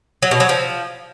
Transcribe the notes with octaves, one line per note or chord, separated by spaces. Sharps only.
F#3
B2
F#3
F3